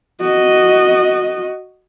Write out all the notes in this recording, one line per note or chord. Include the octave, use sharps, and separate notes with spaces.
F#4 D#5